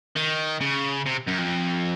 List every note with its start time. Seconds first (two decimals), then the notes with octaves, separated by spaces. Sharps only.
0.16 D#3
0.61 C#3
1.06 C3
1.28 F#2
1.39 F2